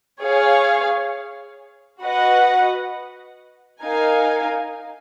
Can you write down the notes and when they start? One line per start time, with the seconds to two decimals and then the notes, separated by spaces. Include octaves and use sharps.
0.22 G#4 C#5 F5
2.01 F#4 B4 D#5 F#5
3.81 D#4 A#4 F5 G#5